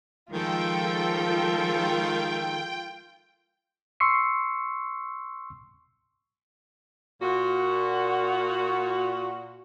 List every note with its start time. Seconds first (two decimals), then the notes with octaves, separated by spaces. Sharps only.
0.32 D#3 F3 G#3 F4 A4 G5
4.00 C6 C#6 E6 C7 C#7
7.21 A#2 F#4